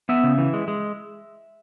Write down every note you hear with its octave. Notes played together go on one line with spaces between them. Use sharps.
B3 E5
C#3
E3
G#3
G#3